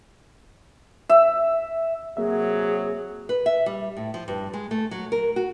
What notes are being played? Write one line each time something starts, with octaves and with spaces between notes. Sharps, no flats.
E5
C3 F#3 A#3 F#4 G#4 E5
B4
E5
G3
A2
F3
G2
G#3
A3
F#3
A#4
F#4